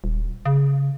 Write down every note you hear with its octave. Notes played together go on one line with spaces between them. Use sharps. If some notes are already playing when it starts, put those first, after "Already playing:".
D#1
C#3